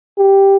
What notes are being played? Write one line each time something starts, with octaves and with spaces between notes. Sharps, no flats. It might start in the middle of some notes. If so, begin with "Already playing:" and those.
G4